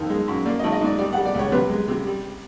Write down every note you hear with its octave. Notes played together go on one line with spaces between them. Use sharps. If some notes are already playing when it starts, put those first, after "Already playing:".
Already playing: F2 D#3
G#3
F#2
A#3 D5
D#5
G#1
D#5
G#2 D5
G3 D5
F#5
G3
D5
C#2 C#5
C3 B4
G#3
C3
G3